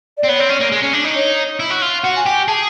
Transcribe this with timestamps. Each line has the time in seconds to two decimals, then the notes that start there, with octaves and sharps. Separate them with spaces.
0.18 D5
0.23 C4
0.28 B3 C#5
0.39 C4
0.49 C#4
0.60 A#3
0.72 G#3
0.82 C#4
0.93 D4
1.04 D#4
1.16 C#5
1.60 E4
1.70 F#4
1.82 F4
2.03 F#4 F#5
2.16 G#5
2.25 G4 G5
2.47 G#4 A5